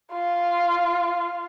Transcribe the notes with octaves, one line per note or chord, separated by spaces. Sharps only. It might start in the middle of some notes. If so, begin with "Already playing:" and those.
F4